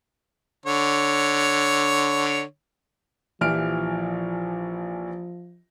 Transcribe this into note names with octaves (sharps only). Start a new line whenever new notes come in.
D3 C#5
A#1 E3 F3 G4 F6 D7